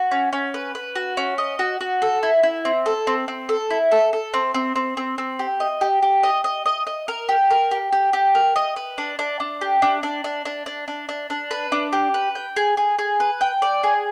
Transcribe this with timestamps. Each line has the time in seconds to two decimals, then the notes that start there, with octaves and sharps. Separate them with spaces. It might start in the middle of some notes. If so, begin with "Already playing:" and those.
Already playing: F#4
0.11 C#4
0.33 C#4
0.54 B4
0.75 B4
0.96 F#4
1.17 C#4
1.38 D#5
1.59 F#4
1.81 F#4
2.02 A4
2.23 E4
2.43 E4
2.65 C4
2.86 A4
3.07 C4
3.28 C4
3.49 A4
3.70 E4
3.91 A4
4.13 A4
4.34 C4
4.54 C4
4.76 C4
4.97 C4
5.18 C4
5.39 G4
5.60 D#5
5.81 G4
6.02 G4
6.23 D#5
6.44 D#5
6.66 D#5
6.87 D#5
7.08 A#4
7.29 G4
7.50 A#4
7.71 G4
7.93 G4
8.13 G4
8.35 A#4
8.56 D#5
8.76 B4
8.98 D4
9.19 D4
9.40 D4
9.61 G4
9.82 D4
10.03 D4
10.24 D4
10.45 D4
10.66 D4
10.88 D4
11.09 D4
11.30 D4
11.51 B4
11.72 D4
11.93 G4
12.14 B4
12.35 G5
12.56 G#4
12.77 G#4
12.99 G#4
13.20 B4
13.41 G5
13.62 D5
13.83 G#4